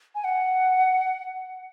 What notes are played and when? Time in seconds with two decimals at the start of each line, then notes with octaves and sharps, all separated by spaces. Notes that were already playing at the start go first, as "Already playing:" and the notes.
0.15 G#5
0.24 F#5